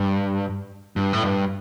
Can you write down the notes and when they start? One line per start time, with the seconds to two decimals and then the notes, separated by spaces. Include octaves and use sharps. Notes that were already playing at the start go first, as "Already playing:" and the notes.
Already playing: G2
0.96 G2
1.13 A2
1.25 G2